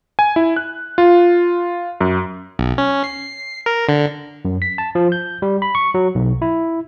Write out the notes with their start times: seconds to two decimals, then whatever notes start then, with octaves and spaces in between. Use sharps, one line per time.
0.19 G#5
0.36 E4
0.56 F#6
0.98 F4
2.01 F#2
2.59 B1
2.78 C#4
3.04 C7
3.66 A#4
3.89 D3
4.45 F#2
4.62 B6
4.78 A5
4.95 F3
5.12 G6
5.42 G3
5.62 B5
5.75 C#6
5.94 F#3
6.15 B1
6.42 E4